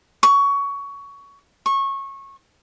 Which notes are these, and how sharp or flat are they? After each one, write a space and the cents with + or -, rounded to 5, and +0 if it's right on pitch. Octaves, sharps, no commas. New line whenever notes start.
C#6 +20
C#6 -20